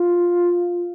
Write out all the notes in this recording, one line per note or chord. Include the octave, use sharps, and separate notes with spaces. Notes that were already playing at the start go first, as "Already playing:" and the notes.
Already playing: F4